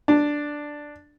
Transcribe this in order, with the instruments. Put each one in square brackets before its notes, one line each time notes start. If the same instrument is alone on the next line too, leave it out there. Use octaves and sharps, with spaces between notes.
[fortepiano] D4